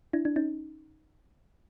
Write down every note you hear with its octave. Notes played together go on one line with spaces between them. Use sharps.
D4 E4
D4
C#4 D#4